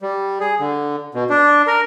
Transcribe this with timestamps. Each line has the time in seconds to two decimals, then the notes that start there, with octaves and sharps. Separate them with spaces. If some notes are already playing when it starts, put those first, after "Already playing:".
0.02 G3
0.40 G#4
0.60 D3
1.15 B2
1.30 D4
1.67 A#4